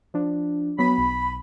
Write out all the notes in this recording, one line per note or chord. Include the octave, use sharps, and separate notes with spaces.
F3 D4
F#3 B3 B5 B6
B1